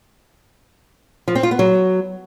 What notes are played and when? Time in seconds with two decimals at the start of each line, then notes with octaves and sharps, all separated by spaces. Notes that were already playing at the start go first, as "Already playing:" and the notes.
1.28 F3
1.35 C4
1.43 F4
1.51 B3
1.59 F#3